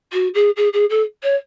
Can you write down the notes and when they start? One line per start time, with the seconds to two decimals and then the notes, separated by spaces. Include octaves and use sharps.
0.12 F#4
0.34 G#4
0.56 G#4
0.73 G#4
0.89 A4
1.23 C#5